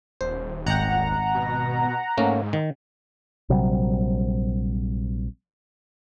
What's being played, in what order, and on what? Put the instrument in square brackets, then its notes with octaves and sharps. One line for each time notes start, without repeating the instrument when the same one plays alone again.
[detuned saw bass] D#1 [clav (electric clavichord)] C5
[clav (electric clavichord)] G#1 G5 [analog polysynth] F#5 A#5
[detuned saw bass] B2
[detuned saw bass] G#2 [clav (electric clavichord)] A3 A#3 C#4
[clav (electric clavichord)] D#3
[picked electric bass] A#1 C3 F#3 G3